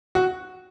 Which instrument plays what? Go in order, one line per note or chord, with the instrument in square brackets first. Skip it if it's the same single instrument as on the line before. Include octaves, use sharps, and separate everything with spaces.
[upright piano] F#4